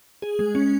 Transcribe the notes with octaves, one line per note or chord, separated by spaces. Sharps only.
G#4
G#3
C#4